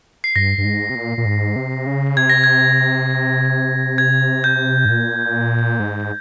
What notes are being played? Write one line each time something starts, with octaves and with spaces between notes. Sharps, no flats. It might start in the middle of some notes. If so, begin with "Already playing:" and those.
C7
G2 A#6
G2
G#2
C3
A#2
A#2
G#2
C3
C#3
C3 G#6
A#6
G#6
G#6
G6
G#2
A#2
G#2